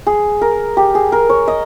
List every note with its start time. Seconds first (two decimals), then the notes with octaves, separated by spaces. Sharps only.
0.07 G#4
0.41 A#4
0.77 G4
0.95 G#4
1.12 A#4
1.30 C#5
1.48 D#5